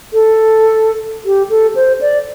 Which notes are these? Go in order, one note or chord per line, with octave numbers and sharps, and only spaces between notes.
A4
G4
A4
C5
D5